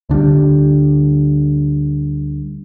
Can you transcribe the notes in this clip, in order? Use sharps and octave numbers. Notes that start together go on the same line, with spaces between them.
D2 D3 F#3 G3